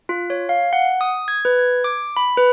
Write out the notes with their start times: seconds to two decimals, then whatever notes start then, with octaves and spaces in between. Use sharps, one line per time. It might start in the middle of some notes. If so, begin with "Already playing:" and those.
0.09 F4
0.30 C#5
0.49 F5
0.73 F#5
1.01 D#6
1.28 G#6
1.45 B4
1.59 G#6
1.84 D6
2.17 B5
2.37 B4